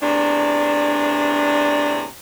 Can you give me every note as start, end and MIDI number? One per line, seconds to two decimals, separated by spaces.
0.01 2.05 40
0.01 2.05 45
0.01 2.05 48
0.01 2.05 62